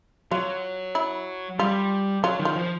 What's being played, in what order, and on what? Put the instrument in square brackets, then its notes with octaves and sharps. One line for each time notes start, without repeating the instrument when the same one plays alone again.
[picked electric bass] F#3 [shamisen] F4
[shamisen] E4
[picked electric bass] G3 [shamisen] F4
[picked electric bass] F#3 [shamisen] F4
[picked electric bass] D#3
[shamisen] F4
[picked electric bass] F3